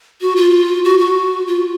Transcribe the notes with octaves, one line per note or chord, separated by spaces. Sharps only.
F#4
F4
F#4
F#4
F4